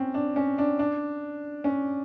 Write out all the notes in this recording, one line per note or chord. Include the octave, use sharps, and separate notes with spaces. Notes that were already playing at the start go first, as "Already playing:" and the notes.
Already playing: C4 C#4
D4
C#4
D4
D4
C#4